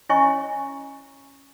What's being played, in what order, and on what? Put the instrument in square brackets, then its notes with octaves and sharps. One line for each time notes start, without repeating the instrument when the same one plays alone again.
[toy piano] C#4 E4 C#5 D#5 G#5 C#6